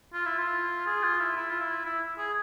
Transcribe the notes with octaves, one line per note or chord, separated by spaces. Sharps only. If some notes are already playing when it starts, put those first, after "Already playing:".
F4
E4
F4
G#4
F4
E4
E4
F4
E4
E4
G#4